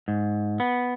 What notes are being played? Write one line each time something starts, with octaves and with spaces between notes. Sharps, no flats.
G#2
B3